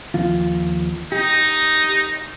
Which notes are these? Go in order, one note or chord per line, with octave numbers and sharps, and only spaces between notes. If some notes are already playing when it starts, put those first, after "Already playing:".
D#2 F3 F4
D#4 G4